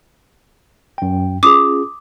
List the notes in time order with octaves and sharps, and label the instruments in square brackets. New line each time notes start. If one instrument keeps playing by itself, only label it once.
[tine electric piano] F#2 G5
[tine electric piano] C#4 F4 G#4 [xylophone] D6 D#6